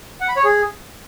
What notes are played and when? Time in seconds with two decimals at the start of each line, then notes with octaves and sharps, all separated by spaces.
0.21 F#5
0.29 B5
0.36 C#5
0.44 G#4